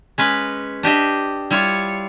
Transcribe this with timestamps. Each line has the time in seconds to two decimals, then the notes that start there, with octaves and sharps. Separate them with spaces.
0.18 G#3 C#4 B4
0.83 D4 G4 D#5 E5
1.51 G3 E4 F4 C#5